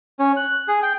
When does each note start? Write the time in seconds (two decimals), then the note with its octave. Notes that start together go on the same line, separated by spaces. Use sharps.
0.19 C#4
0.37 F#6
0.68 G#4
0.83 G5